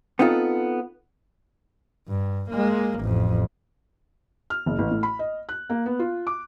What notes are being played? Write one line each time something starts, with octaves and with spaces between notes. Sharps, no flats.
B3 C4 D#4 F4 A4
G2
G#3 A#3
A1 F2
F6
F#1
A1
A2
B5
D#5
F#6
A#3
B3
F4
D6